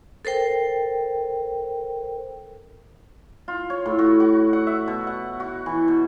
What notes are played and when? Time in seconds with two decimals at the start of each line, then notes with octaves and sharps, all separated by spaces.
0.25 A4 A#4 C5 G5
3.48 F4
3.70 C#5
3.86 A2
3.99 F#4
4.20 F#4
4.53 F#5
4.67 E5
4.88 B2
5.07 F#5
5.40 F#4
5.66 E3
5.88 B2